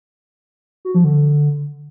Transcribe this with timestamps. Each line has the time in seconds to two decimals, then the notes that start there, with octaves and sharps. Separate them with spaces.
0.85 F#4
0.95 F3
1.04 D3